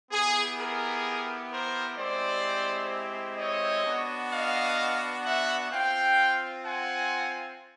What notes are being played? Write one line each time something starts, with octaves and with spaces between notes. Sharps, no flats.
B3 E4 G4 G#4
G#4 A#4
A#4 C5
G#3 C4 E4 G4 C5 D5
C#5 D#5
B3 D4 F#4
D#5 F5
E5 F#5
C4 F4 F5 G5
F#5 G#5